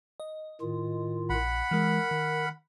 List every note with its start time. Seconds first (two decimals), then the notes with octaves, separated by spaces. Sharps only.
0.20 D#5
0.61 A2 D#3 F4
1.30 A#1 F#5 B5
1.71 E3 G#3 A#4
2.11 D#3